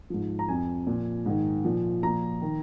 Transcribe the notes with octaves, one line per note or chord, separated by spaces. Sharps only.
G#2 F3
A#5
F2 F3 G#5
A#2 F3
G#2 D#3
A#2 F3
A#2 F3 A#5
D#3